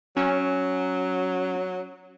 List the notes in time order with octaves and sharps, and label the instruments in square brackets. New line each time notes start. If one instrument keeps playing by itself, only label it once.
[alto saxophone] F#3 [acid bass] C#4